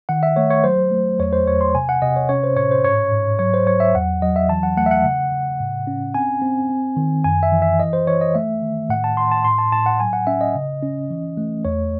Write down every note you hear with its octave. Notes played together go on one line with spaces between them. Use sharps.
D#3 F#5
E5
A3 C#5
C#5
F#3 C5
A3
E2 C#5
C5
E2 C#5
C6
C3 G#5
F#5
C3 D#5
C#5
C#4 C#5
C5
A2 C#5
C5
G#2 C#5
G#2
F#3 C#5
C5
F#3 C#5
E5
E2 F#5
F#3 D#5
E5
E3 A5
F#5
A3 F#5
E5
F#5
C#3
C#3
A2
C#4
C4 G#5
C4
C4
D#3
F#2 G#5
E5
E3
E5
E3 D#5
C5
E3 C#5
D#5
A3 E5
D#3
A2 F#5
A5
A2 C6
A5
A2 C6
A5
A2 A5
F#5
F#3 G#5
F#5
C#4 E5
D#5
C#3
C#4
E3
A3
E2 C#5